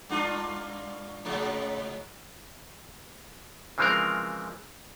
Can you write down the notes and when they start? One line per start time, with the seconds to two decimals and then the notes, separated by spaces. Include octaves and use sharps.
0.09 G2 D4 F4
1.25 G#2 C#3 F#3
3.78 C#3 E3 F3 G#3 C4 A#4